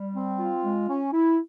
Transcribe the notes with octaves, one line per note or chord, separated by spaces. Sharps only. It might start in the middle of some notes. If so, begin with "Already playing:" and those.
Already playing: G3
C4
F4
G#3
C#4
E4